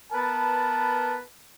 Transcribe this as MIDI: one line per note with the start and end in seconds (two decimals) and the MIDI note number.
0.12 1.19 59
0.12 1.19 70
0.12 1.19 71
0.12 1.19 81